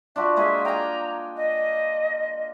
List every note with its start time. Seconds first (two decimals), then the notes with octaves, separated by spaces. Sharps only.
0.16 D4 F4 F#4 E5
0.36 G#3 A#3 G#4 E5
0.65 G5 G#5 A#5
1.36 D#5